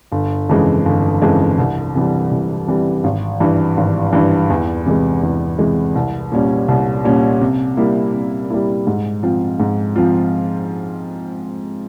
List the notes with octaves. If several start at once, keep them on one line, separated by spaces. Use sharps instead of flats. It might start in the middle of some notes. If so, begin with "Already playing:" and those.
G1
F2 C#3 E3 G#3
G1
F2 C#3 E3 G#3
C2
C3 E3 G3
C2
C3 E3 G3
G#1
G2 E3
G#1
G2 E3
E2
C3 E3 G#3
E2
C3 E3 G#3
C2
A#2 G3 C#4
C2
A#2 G3 C#4
C3
G3 A#3 E4
C3
G3 A#3 E4
G#2
F3 C4 F4
G#2
F3 C4 F4